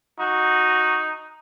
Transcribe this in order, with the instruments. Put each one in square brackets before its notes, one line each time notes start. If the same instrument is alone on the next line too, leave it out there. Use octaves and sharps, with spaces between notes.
[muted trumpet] D#4 [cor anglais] F#4